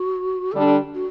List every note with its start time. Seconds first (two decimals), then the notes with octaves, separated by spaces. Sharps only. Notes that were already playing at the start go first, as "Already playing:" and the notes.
Already playing: F#4
0.52 D3 G3 D4 A4
0.94 F#4